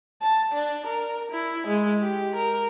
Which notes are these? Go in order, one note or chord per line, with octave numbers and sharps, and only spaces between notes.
A5
D4
A#4
E4
G#3
G4
A#4